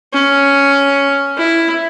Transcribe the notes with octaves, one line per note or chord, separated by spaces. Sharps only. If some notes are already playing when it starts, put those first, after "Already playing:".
C#4
E4